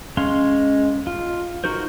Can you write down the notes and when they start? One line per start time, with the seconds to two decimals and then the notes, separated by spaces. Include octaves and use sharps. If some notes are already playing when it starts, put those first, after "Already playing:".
0.17 G#3 C#4 F5 C6
1.07 F4
1.64 D#4 F#4 A#4 C5